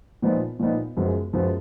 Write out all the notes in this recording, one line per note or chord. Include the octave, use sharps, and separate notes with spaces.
A#2 F3 B3 D#4
A#2 F3 B3 D#4
F#2 F3 G#3 B3
F#2 F3 G#3 B3